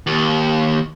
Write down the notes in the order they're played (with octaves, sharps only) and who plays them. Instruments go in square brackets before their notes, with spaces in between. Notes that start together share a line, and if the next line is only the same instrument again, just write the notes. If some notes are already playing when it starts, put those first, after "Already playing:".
[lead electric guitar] D#2